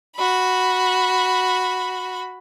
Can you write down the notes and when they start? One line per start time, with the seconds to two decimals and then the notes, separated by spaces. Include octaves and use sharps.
0.15 F#4 B5